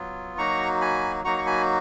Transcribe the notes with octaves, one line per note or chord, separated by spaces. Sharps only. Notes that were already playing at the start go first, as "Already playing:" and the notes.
Already playing: F#3 B3 F4
F#3 A#3 D#4 F#4 A#5 C#6
G#5 B5
F#3 A#3 D#4 F#4 A#5 C#6
C#6
G#5 B5